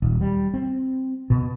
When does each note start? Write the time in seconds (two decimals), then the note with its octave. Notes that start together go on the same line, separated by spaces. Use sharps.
0.02 D#1
0.21 G3
0.54 C4
1.30 B2